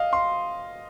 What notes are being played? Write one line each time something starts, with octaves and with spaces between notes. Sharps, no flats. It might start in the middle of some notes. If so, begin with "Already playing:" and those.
Already playing: D#5 F5
C6